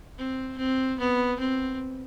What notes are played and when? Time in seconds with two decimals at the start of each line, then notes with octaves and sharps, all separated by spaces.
0.18 C4
0.58 C4
0.99 B3
1.39 C4